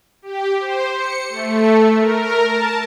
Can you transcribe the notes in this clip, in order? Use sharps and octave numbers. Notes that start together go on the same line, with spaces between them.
G4
C5
C#7
A3
A#4
A5